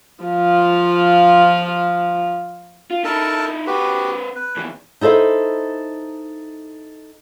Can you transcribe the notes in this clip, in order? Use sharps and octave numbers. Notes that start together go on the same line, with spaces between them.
F3 F4
F4
D#4 E4 A4 A#4 A5
C4 F#4 G4 B4
B4
D#2 E3
D#4 E4 A4 C5 D#5